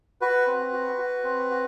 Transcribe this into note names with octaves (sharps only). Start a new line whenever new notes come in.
F#4 B4
C4
F#4
F#4
C4
F#4